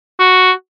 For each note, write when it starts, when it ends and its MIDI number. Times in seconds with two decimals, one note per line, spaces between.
0.19 0.51 66